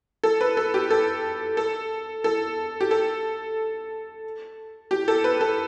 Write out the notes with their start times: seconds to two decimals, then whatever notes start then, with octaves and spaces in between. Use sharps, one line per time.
0.23 A4
0.41 B4
0.57 A4
0.74 G4
0.91 A4
1.57 A4
2.24 A4
2.81 G4
2.91 A4
4.91 G4
5.08 A4
5.24 B4
5.41 A4